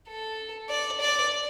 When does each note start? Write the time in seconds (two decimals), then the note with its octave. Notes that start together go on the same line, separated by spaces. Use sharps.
0.09 A4
0.69 D5
1.01 D5